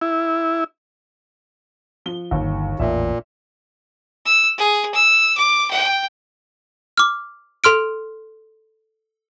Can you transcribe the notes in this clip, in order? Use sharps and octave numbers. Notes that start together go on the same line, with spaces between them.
E4
F3 G7
G1 D#2
A1 E2 A#2 E5
E6
G#4
E6
D6
G5
D6 F6
A4 C6 F6 D7